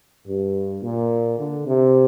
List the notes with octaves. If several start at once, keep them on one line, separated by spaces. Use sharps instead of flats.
G2
A#2
D3
C3